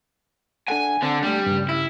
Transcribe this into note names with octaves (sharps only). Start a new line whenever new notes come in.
D4 A4 F#5 G#5
D3 C4
G3 A3 D4
G2 C#3
E4